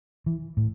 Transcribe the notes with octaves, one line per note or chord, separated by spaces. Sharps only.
E3
A2